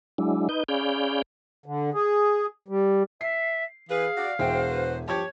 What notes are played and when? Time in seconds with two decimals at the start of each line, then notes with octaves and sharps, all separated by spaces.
0.18 F#3 G#3 D4 E4
0.49 D#4 B4 D#5 G6
0.68 C#4 G#4 D5 F5 B5 G6
1.66 D3
1.94 G#4
2.68 G3
3.21 E5 C7
3.89 E3 G#4 B4 F5
4.17 F#4 D5
4.39 E1 F#4 G#4 C5 E5 G5
4.69 B4
5.08 G2 F3 G4 C#5 A5 C#6 G#6